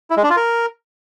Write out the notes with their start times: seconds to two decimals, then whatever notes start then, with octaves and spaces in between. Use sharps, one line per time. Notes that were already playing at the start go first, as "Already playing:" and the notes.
0.10 E4
0.17 G#3
0.23 D4
0.30 F4
0.36 A#4